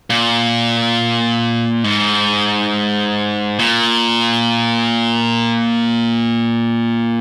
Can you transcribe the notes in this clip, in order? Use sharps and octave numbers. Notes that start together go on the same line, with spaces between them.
A#2
G#2
A#2